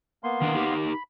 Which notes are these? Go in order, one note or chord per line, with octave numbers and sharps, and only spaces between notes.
A#3 B3 C6
D#3 D4 A#4
D#4 G4 A#4
B5